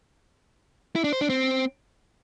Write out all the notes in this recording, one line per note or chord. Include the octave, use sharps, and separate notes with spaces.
E4
D4
C5
D4
C4